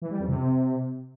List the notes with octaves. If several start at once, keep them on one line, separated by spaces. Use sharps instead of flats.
E3
G3
F2
C3